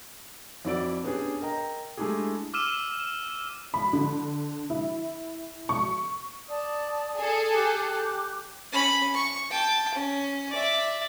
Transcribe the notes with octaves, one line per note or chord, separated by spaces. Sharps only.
F2 E4 F#4 D5 E6 D7
B3 C#4 D4 G4 G#4
A#4 D#5 G5 A#5
G#3 A3 D4 E4 G4 G#4
D6 E6 F6 D#7 E7
B5
D3
E4
C#6
D5 A5 D#6
G#4 A4
G4 D6 F#6
C#4 B5
C#6
G5 A5
C#4
D5 E5